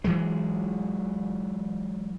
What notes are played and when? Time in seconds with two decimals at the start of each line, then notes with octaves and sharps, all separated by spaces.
0.04 E3 F#3 G#3